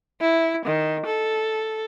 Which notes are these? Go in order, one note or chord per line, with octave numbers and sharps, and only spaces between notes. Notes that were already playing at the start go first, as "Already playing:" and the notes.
E4
D#3
A4